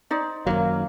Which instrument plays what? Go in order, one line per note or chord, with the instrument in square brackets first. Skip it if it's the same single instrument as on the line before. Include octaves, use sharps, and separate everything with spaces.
[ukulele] D#4 C5 D5
[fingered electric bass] F#2 D#3 F#3 [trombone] A#3